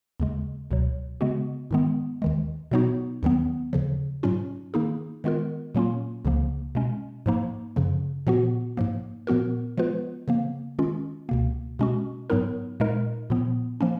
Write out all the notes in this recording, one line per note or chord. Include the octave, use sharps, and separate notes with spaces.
D#2 C#3 G#3
C#2 B2 F#3
C#3 G#3 B3 F#4
G#2 D#3 G#3 B3
D#2 D#3 G#3
B2 F#3 B3 D#4 F#4
D#2 D#3 F#3 B3
D#2 C#3 F3
G#2 F#3 C#4 F4
D#3 A#3 D#4 G#4
D#3 G#3 B3 F4 A#4
A#2 F#3 A#3 C#4 F4
C#2 C#3 F3 A#3
B2 G#3 C#4
G#2 F3 A#3 D#4
F#2 C#3 F3
A#2 F3 B3 F#4
G#2 F3 A#3
A#2 F3 B3 F#4 A#4
F3 G#3 B3 F4 B4
C#3 F3 A#3
D#3 G#3 C#4 F4
C#2 B2 A#3
B2 G#3 C#4 F#4
G#2 F#3 B3 D#4 A#4
A#2 G#3 D#4 A#4
A#2 F3 B3
F3 A#3 C#4